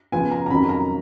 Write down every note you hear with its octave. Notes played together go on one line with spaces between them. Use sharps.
C#3 F3 B3 G#5
A#5
A#5
F2 D#3 F#3 C#4 B5
A#5